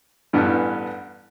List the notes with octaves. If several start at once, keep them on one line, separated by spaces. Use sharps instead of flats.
A1 G2 E3 G3 B3